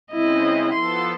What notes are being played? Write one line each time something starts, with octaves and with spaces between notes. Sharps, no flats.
C#3 G#3 C4 E4 D#5
F3 B3 A4 C6